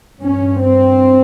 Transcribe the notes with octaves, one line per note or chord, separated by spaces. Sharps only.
G2 C#4
C4